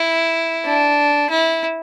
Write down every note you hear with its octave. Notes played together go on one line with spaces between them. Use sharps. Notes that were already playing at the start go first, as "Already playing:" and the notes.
Already playing: E4
D4
E4